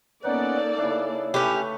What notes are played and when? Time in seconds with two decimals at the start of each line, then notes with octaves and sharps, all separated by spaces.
0.24 A#3 B3 C#4 D#4 A4 D5 F#5
0.78 C#3 D4 E4
1.34 A3 C#4 G4 B4 C#6